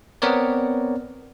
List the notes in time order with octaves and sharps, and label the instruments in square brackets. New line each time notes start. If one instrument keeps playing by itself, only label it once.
[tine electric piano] B3 C4 A#4 C#5 D5